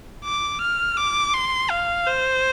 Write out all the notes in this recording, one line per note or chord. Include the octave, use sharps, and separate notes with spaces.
D6
F6
D6
C6
F5
C5